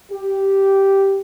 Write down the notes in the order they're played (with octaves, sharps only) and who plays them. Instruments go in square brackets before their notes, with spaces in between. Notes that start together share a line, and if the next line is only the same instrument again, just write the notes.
[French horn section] G4